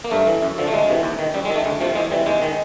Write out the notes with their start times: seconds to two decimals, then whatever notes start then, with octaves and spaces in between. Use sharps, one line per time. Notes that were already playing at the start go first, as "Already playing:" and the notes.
0.04 A#3
0.11 G2 A3
0.27 E3
0.42 F#2
0.58 D3 F3
0.67 A3
0.73 D2 G#3
0.88 C3 E3
1.03 D#2
1.19 D#3
1.34 F#2 G3
1.45 G#3
1.50 D#3
1.56 A3
1.65 D2 G#3
1.81 C3 F3 A3
1.95 E2 G#3
2.11 C3 E3 G3
2.26 D#2 G#3
2.42 D#3